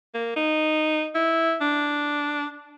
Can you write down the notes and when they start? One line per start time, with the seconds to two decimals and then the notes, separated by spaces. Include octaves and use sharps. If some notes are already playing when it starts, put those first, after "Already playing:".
0.14 A#3
0.36 D#4
1.15 E4
1.61 D4